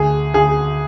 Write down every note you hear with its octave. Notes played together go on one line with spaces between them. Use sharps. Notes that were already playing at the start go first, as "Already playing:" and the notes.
Already playing: D2 G#4
D2 G#4